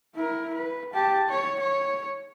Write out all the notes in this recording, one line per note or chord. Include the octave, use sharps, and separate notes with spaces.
E4 A#4
B4
G4 A5
C#5
C#5